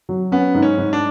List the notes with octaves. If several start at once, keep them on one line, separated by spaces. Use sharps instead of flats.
F#3
B3 C#4
G#2
C#4
G#2
D4